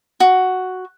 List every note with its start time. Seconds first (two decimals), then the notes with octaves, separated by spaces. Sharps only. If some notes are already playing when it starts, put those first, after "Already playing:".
0.20 F#4